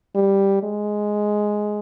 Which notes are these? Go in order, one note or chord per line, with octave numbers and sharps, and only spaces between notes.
G3
G#3